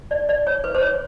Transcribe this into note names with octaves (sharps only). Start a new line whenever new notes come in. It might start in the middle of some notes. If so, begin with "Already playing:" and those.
D5
D5
C#5
B4
C5
C#5